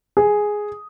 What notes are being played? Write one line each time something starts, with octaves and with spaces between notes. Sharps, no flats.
G#4